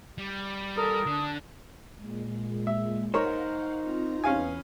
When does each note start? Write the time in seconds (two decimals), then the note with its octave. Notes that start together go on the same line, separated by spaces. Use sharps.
0.18 G3
0.76 A4 A#4 D#6
1.06 D3 D4
1.96 A#2 G#3
2.67 E5
3.14 D#4 A#4 C5 C#5 F5 F#5 C#6
3.82 C4 F4 A#5
4.24 E2 C#4 B4 F5 G#5 D#6